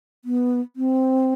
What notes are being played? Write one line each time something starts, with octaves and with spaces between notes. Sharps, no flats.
B3
C4